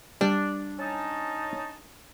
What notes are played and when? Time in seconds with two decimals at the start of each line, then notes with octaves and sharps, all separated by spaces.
0.21 G3 D4
0.79 C#4 D#4 A5